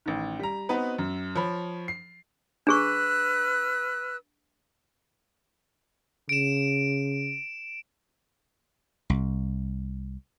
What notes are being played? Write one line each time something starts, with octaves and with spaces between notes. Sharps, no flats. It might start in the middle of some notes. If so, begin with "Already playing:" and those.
A1 D#3
G3 A#5
B3 C4 D#4 F#4 B4
F#2
F3 C#5 B5
C7
D4 G#4 B4 C#6 E6 F#6
C#3 D7 E7
C2